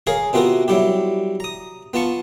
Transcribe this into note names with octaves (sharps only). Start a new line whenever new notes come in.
G#4 A#4 C#5 F5
C3 B3 C4 F4 F#4 A#4
F#3 G3 E4 G4
A#5 D#6
B3 F4 A5 C#6